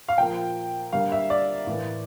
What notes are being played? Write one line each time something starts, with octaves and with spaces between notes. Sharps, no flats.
F5
A#2 F3 A#3 G5
D3 G3 A#3 F5
E5
D5
A2 E3 A#3